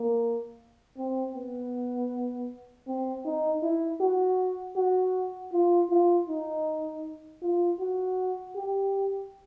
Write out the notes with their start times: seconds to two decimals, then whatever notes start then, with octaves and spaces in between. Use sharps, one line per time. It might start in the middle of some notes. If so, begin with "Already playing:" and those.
Already playing: A#3
0.97 C4
1.35 B3
2.87 C4
3.25 D#4
3.63 E4
4.01 F#4
4.76 F#4
5.53 F4
5.90 F4
6.29 D#4
7.42 F4
7.80 F#4
8.56 G4